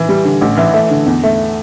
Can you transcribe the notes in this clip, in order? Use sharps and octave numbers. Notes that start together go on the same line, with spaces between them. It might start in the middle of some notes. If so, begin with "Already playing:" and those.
Already playing: E3
G3
D3
A1
E3
A3
D3
E2
A3